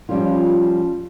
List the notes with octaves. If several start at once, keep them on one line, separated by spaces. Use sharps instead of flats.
F3 G3 C#4 F4